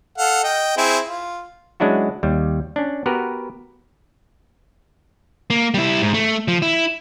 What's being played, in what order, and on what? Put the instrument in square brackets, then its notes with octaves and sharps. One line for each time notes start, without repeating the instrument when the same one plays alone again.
[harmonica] A4 F5 F#5
D#5 G5
C4 E4 G#4
F4
[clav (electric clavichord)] F#3 G#3 C#4 D4 E4 F#4
D#2 G3
C#4 D4
B3 F#4 G4 A#4 B4
[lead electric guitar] A#3
G3 E4
G#2
A3
F3
E4